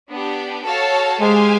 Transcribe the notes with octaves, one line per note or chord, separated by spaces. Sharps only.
B3 D4 G4
F#4 A4 C#5 F5 A5
G#3 G4 C5 F5 G#5